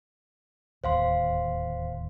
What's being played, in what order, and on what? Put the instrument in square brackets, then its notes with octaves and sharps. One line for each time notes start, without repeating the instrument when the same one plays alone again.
[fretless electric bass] D1 D#2 [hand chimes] C5 F5 C6